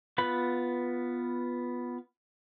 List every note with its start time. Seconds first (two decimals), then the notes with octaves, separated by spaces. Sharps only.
0.18 B3 F4 B4 B5